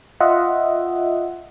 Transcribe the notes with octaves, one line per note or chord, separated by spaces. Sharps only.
F4 D#5 E5 F#5